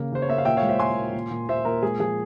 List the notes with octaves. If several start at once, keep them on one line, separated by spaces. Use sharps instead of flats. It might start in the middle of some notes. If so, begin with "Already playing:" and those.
Already playing: C#3 A#3
C#3 C5
C#5
A#3 E5
F5
A#2 E5 G5
C#5 F5
G#3
C5 E5
G#3 G#5 C6
A#2
A#2
A#2
A#2 C5 E5
A#2 A#4
G#3 G#4
F3 G#4